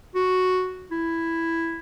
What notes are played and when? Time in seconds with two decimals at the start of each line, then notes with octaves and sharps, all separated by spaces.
0.15 F#4
0.91 E4